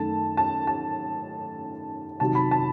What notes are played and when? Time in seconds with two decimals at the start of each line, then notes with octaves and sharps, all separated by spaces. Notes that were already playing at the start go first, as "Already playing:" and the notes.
Already playing: F#2 D#3 A3 A5
0.37 A5
0.67 A5
2.20 C3 D#3 F#3 A5
2.35 B5
2.51 A5